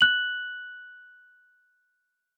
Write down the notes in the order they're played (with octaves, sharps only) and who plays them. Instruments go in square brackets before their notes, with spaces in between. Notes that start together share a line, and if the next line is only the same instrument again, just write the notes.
[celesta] F#6 F#7